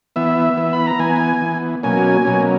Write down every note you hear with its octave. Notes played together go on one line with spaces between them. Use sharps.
E3 B3 E5
E3 B3
B5
A#5
E3 B3 G#5
E3 B3
B2 F#3 A#3 C#4 G#5
B2 F#3 A#3 C#4